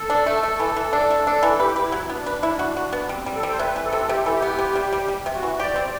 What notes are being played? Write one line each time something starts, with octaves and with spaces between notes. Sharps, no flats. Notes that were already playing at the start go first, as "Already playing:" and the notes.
Already playing: A4
D4
A3
A3
E3
E3
D4
A3
D4
E3
A4
G4 B4
B4
E4
F#3
B3 D4
B4
E4
F#4
F#4
B3
G3 C4
G3
A4
G3
C5
C3 B4
E3
A4
C3
C3 G4
E3 A4
G4
B3
C3
G3
G3
G3
C3
F#4
E3
G4 D5
C4 C5
D5